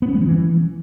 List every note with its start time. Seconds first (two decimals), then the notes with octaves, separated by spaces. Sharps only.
0.02 B3
0.08 C#4
0.15 G#3
0.21 F3
0.27 E3